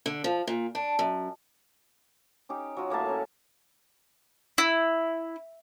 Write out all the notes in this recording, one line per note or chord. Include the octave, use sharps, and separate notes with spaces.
D3
F3
A#2
D4
F#2
C#4 D#4 G4
F#3 F4
A2 A#3 E5 A5
C#4
E4